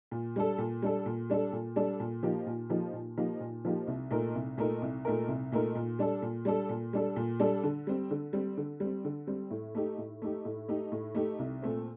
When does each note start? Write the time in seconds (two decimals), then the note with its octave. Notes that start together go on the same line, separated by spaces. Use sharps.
0.12 A#2
0.36 G3 D4 A4
0.58 A#2
0.82 G3 D4 A4
1.06 A#2
1.30 G3 D4 A4
1.53 A#2
1.76 G3 D4 A4
2.00 A#2
2.23 F3 A#3 D#4 G4
2.46 A#2
2.70 F3 A#3 D#4 G4
2.93 A#2
3.17 F3 A#3 D#4 G4
3.40 A#2
3.65 F3 A#3 D#4 G4
3.87 C2
4.11 A#2 A3 D#4 A#4
4.35 C2
4.57 A#2 A3 D#4 A#4
4.82 C2
5.05 A#2 A3 D#4 A#4
5.28 C2
5.52 A#2 A3 D#4 A#4
5.75 A#2
5.99 G3 D4 A4
6.22 A#2
6.45 G3 D4 A4
6.69 A#2
6.93 G3 D4 A4
7.16 A#2
7.40 G3 D4 A4
7.63 D3
7.87 G3 C4
8.11 D3
8.33 G3 C4
8.57 D3
8.80 G3 C4
9.04 D3
9.27 G3 C4
9.51 A2
9.75 A3 D#4 G4
9.98 A2
10.22 A3 D#4 G4
10.45 A2
10.68 A3 D#4 G4
10.92 A2
11.15 A3 D#4 G4
11.39 C2
11.62 A#2 A3 C4